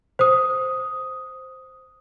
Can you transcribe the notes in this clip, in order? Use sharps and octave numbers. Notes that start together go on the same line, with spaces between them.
C5 D#6